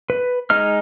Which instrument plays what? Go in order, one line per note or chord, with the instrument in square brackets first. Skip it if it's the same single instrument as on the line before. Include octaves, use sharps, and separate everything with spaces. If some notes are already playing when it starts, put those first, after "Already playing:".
[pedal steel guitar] B4
G#3 D#4 D#5 F6